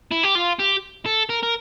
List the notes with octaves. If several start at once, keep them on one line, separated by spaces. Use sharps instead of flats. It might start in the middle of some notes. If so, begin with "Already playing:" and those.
E4
G4
F4
G4
A4
A#4
A#4